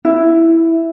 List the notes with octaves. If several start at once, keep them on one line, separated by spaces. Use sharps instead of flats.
E4